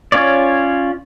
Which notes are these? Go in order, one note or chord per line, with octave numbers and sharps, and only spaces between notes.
C#4 F4 C#5 D5